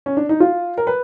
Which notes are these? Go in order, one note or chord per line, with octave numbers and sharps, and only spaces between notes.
C#4
D4
D#4
F4
A#4
B4